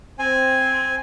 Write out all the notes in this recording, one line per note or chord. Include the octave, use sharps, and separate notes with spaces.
C4 G#5